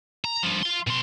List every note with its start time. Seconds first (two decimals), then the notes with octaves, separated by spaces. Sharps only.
0.24 A#5
0.43 G2 F3
0.63 F5 C6
0.87 B2 C6